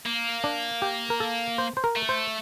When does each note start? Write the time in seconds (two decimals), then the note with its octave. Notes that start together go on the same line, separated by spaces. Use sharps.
0.06 A#3
0.44 D4
0.82 G4
1.10 A#4
1.20 A4
1.58 C5
1.77 C5
1.84 A#4
1.96 A3
2.09 C5